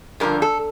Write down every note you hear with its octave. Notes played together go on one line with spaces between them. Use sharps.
G2 D3 F3 A#4
A4